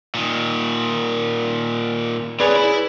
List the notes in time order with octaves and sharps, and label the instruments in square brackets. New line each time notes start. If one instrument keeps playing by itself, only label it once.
[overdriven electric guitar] A#2 D#3
[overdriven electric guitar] C4 C#5 [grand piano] G#4 B4 D5
[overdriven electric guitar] E4 B5